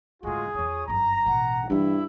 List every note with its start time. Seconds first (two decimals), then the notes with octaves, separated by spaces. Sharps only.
0.23 D2 A2 G#3 F4 F#4 G#4
0.54 E2 F4 C#5 D#6
0.88 G1 F#2 A#5
1.26 A1 B2 F#5
1.70 G2 E3 D4 E4